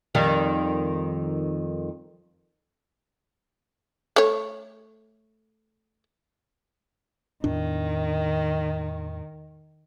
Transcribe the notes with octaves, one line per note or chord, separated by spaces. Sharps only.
F2 D#3 G3
A3 C#5
E2 A2 D#3 D4